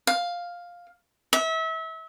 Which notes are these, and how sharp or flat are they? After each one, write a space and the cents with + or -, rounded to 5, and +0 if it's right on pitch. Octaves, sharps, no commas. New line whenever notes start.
F5 +5
E5 -30